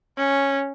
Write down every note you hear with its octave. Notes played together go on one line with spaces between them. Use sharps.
C#4